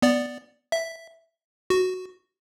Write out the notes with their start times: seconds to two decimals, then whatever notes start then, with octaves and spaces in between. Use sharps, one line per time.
0.02 B3 D5
0.72 E5
1.70 F#4